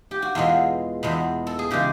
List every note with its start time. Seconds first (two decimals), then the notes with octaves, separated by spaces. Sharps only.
0.11 G4
0.22 F#4
0.35 E2 B2 G#3 F4
1.03 E2 B2 G#3
1.47 A4
1.59 G#4
1.71 C#3 E3 G#3 G4